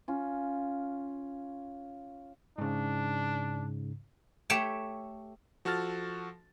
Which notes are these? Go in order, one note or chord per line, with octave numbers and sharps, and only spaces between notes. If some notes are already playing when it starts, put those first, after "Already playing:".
C#4 F4
G#2 C#3 D4
A3 G4 C#5 G5
F3 F#4 A4 A5 F6 A6